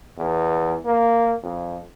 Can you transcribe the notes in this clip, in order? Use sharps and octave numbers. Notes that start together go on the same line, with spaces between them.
E2
A#3
F2